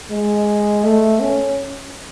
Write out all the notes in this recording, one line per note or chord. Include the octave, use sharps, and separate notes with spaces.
G#3
A3
C#4